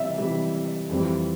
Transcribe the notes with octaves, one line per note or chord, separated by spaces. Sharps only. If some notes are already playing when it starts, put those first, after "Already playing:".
Already playing: C3 E3 G3 D5 E5
C3 E3 G3
F2 E3 G3